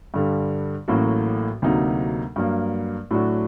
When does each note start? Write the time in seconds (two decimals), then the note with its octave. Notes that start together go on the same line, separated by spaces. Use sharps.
0.14 G2 D3 G3
0.88 A1 A2 F#3 A#3 F#4
1.62 D2 C3 F#3 A#3 D#4
2.36 G2 F#3 A#3
3.11 A2 F#3 A3 D4 F#4